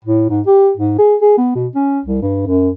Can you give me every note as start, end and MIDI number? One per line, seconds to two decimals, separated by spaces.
0.05 0.29 45
0.29 0.41 44
0.46 0.71 67
0.77 0.96 44
0.98 1.16 68
1.21 1.36 68
1.38 1.51 59
1.55 1.67 47
1.75 2.00 61
2.05 2.21 36
2.22 2.44 43
2.47 2.69 42